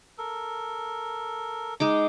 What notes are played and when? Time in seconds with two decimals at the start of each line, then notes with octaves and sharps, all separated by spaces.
0.18 A4 A#4
1.80 G#3 D#4 D6